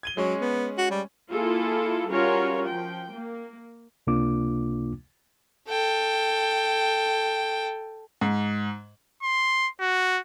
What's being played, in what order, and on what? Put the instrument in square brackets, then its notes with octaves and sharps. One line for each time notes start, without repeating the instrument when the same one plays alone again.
[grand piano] G#6 D#7 G7
[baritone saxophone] F#3 [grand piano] G#3 C#4 C#6
[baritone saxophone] B3
F#4
G3
[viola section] A#3 E4 F4 G#4 A4
G3 C#4 F4 F#4 A#4 C#5
F3 G5
A#3
[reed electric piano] C#2 C3 A#3 D4 F4 D6
[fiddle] A4 G5
[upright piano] G#2
[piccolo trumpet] C6
F#4